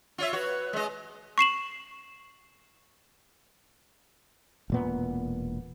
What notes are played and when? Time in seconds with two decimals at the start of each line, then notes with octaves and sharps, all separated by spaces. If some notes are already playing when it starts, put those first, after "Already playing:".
0.18 F4 C#5 E5
0.33 F#4 B4 C#5
0.73 G#3 D#5
1.38 C#6 C7 E7 F#7
4.70 E1 A#2 B3